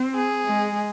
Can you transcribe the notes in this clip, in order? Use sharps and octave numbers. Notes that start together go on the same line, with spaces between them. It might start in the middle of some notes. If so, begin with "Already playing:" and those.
Already playing: C4
G#4
G#3